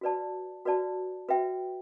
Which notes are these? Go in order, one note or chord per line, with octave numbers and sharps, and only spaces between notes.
F#4 B4 D5 A5
F#4 B4 D5 A5
F#4 B4 E5 G5